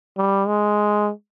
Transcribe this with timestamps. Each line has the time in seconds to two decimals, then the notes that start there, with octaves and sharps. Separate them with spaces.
0.17 G3
0.47 G#3